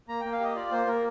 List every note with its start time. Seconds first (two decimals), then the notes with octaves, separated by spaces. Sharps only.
0.09 A#3 A#5
0.20 A#3 G5
0.32 F5
0.40 G4 D#5
0.56 F4 D5
0.72 A#3 C5
0.87 A#3 A#4